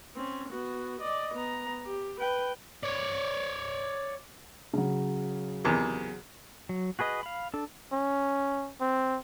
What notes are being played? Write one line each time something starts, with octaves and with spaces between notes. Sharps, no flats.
C4 C#4
B3 F#4
D5 D#5
B3 A#5
G4
B4 G5
C#5 D5
C#3 F#3
E2 C3 D#3
F#3
F#4 G#4 B4 D#5
F5 B5
D4 A4
C#4
C4